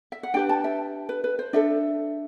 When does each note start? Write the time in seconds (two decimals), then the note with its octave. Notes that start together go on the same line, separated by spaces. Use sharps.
0.12 E5
0.23 F#5
0.34 D4 G4 B4 G5
0.49 A5
0.64 E5
1.09 B4
1.24 B4
1.39 C5
1.53 D4 A4 E5